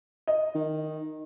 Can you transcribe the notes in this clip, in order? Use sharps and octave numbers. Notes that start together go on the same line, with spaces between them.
D#5
D#3